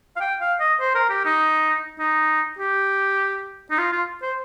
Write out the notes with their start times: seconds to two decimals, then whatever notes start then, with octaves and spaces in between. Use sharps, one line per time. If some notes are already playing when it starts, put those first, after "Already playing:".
0.16 F5
0.20 G5
0.41 F5
0.60 D#5
0.80 C5
0.95 A#4
1.10 G4
1.25 D#4
1.99 D#4
2.59 G4
3.70 D#4
3.78 F4
3.92 F4
4.22 C5